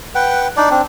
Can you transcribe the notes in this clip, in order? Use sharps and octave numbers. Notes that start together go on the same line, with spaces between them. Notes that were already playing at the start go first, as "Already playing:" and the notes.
B4 F#5 G5
D4 D#4 D5
C4 D4